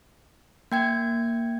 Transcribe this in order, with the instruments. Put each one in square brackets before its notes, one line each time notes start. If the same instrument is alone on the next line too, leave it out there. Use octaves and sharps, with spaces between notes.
[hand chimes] A#3 G5 G#6